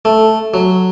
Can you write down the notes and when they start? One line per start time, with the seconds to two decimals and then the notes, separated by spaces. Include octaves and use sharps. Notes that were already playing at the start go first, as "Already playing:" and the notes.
0.05 A3
0.54 F#3